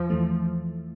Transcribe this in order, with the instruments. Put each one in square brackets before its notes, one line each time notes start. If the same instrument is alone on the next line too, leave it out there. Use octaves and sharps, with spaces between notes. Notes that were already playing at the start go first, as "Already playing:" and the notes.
Already playing: [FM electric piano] E2 [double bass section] F3
[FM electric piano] E2 E3 A3